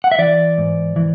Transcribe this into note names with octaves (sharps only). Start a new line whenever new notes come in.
F#5
E5
E3 D5
G#2
E3